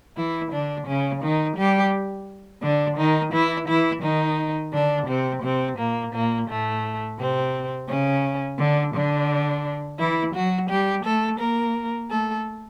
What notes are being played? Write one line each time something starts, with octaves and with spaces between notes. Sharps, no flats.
E3 E4
D3 D4
C#3 C#4
D#3 D#4
G3 G4
D3 D4
D#3 D#4
E3 E4
E3 E4
D#3 D#4
D3 D4
C3 C4
C3 C4
A#2 A#3
A#2 A#3
A2 A3
C3 C4
C#3 C#4
D3 D4
D3 D4
E3 E4
F#3 F#4
G3 G4
A3 A4
A#3 A#4
A3 A4